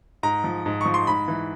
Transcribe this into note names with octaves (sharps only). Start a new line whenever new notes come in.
G#2 A#5
F3
G#2
F3 C#6
C6
G#2 B5
E3